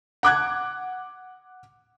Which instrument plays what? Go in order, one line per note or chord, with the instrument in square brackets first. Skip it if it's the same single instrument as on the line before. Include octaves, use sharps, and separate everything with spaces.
[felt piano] F#5 D6 F#6 G#6